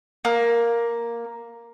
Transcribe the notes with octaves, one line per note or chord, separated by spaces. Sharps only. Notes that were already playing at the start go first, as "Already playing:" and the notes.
A#3